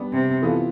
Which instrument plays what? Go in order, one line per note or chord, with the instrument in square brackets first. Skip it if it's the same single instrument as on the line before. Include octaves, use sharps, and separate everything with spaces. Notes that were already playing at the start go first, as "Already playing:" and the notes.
Already playing: [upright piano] G3 B3 D4
[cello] C3
[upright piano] E3 B3 F4 A4